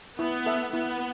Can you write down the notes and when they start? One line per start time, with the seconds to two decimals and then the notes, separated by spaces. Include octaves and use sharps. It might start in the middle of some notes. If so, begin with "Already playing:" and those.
0.19 B3 E4
0.46 A4 E5
0.73 B3 E4